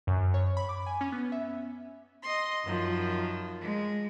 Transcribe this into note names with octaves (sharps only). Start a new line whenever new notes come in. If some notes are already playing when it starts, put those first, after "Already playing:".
F#2
C#5
B5
D6
G#5
C#4
B3
E5
D#5 C6
F#2 D#3 F3
G#3